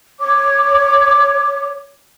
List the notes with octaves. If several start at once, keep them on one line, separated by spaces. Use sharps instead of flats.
C#5 D6